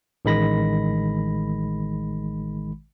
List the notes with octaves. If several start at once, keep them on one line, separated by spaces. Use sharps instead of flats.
A1 D#3 G#3 B5 A#6